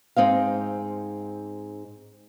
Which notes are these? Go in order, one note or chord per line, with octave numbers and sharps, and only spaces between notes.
G#2 C4 D#5 F5